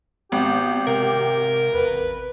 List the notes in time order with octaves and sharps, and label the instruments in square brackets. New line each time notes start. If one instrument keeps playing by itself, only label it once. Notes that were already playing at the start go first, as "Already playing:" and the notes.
[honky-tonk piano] G#1 [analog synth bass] B3 [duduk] G4
[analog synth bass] C3 [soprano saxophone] A#4
[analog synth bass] E2 [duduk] B4
[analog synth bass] A1